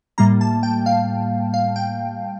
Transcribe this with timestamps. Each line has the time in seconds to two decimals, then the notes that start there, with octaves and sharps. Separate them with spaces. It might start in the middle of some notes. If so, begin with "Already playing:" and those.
0.18 A2 G3 A#3 A#5
0.41 A5
0.63 G5
0.86 F5
1.54 F5
1.76 G5